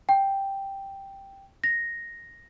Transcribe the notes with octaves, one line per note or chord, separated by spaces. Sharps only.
G5
A#6